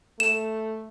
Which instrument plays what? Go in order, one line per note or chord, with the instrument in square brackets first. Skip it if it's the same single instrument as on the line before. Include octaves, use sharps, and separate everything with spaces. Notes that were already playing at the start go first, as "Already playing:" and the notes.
[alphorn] A3 [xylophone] E7